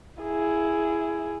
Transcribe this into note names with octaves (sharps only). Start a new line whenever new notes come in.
E4 G#4